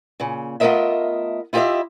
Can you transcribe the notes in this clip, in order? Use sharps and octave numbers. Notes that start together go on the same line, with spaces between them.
A#2 C#3
A3 B3 F4 A#4 D#5 E5
E4 F4 G4 A4 D#5 E5